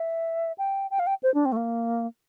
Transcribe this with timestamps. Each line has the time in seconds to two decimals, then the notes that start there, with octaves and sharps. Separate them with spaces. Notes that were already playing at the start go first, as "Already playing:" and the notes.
Already playing: E5
0.58 G5
0.91 G5
0.99 F5
1.07 G5
1.23 C5
1.34 D4
1.45 C4
1.52 A3
1.57 A#3